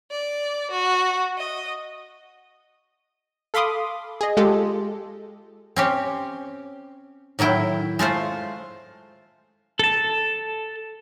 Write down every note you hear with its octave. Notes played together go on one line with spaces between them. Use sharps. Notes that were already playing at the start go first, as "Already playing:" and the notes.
D5
F#4
D#5
A4 F5 B5 C6 D6 D#6
G#4 D#5
G#3 F4 G4 A4
C4 C#4 G4
A2 D#3 F#3 E4 G5
G#3 A3 F4 C5
A4 A5